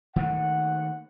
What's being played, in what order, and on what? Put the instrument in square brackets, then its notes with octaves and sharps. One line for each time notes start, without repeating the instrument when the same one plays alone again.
[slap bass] D#3 A3 A#3 [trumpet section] F#5